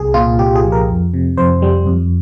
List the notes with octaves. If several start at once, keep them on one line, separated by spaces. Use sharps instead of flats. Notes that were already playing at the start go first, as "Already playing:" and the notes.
Already playing: C2 G#4
A#2 F4
C2 G4
G#4
F3
A#4
F2
C3
F2 C5
G3
F2